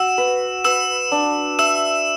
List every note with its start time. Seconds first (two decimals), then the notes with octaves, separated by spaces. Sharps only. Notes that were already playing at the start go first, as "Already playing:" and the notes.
Already playing: F#4 E6 E7
0.18 B4
0.64 B4 E6 E7
1.12 D4
1.59 E5 E6 E7